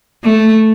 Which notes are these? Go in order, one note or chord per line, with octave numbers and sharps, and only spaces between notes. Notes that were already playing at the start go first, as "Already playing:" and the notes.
A3